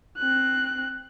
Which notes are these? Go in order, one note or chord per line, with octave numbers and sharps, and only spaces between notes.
C4 F#6